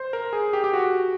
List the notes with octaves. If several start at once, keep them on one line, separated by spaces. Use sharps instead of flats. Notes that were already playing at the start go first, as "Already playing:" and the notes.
Already playing: C5
A#4
G#4
G4
G4
F#4